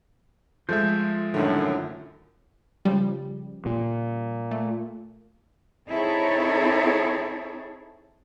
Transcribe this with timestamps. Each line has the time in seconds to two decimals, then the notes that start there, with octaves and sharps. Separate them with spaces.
0.69 F3 G#3 A3 F4 E5 G6
1.34 C2 F#2 A2 D3 D#3
2.85 C#3 F3 G3
3.66 A#2
4.51 A3
5.89 C4 D#4 E4 G#4 A4 C#5